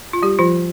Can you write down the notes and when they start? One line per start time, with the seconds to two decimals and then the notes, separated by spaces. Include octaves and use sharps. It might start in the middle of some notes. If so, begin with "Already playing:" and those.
0.13 F4
0.23 G3 G4
0.39 F3 F4